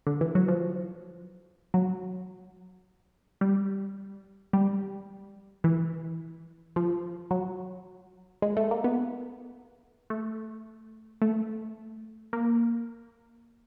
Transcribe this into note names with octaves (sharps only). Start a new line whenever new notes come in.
D3
E3
F#3
F3
F#3
G3
G3
E3
F3
F#3
G#3
A3
A#3
B3
A3
A3
A#3